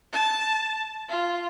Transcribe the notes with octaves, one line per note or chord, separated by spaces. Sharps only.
A5
F4